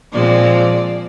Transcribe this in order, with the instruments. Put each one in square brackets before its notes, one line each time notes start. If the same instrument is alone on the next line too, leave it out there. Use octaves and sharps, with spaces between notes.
[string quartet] A#2 F3 G#3 C4 D5